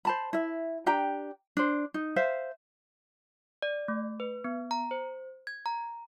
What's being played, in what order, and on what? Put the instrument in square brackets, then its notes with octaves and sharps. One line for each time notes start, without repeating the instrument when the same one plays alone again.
[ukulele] C5 A5 B5
E4 E5
D4 G4 G5 A#5
D4 C5
D#4
C5 E5 F5
[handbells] D5
A3
B4
B3
A#5
C5
G#6
A#5